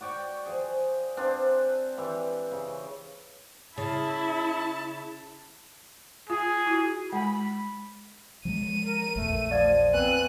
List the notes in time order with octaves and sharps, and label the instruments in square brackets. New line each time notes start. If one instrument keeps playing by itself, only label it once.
[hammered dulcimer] F#4 D5 G5 C#6
F3 G#4
C4 D4 F4 C5
E3 G4 E5
C#3
[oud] C#3 [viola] E4 [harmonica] A5
[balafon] F4 [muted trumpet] G#4
[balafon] E4 F#4
[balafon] G#3 G#5 [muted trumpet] B5
[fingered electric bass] F3 F#3 G#3 [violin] D#7
[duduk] A#4
[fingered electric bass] A#1 E2 [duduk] A3
[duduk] F3 [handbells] D5 F5 G#6
[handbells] B3 B4 G#5 [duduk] C4 [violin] F#6 D#7